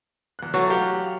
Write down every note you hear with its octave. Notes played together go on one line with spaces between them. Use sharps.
E2 F#6
E3 F#3 A3
G4 F5 F#5